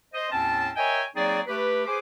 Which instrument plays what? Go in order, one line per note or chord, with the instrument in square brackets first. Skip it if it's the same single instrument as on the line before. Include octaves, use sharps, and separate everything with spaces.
[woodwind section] C5 D#5
D#2 A2 C4 C#4 A5
A#4 C#5 D#5 E5 G5 G#5
F#3 A#3 C4 D#4 G#4 D5
A3 G4 B4
G#4 B4 C5 D6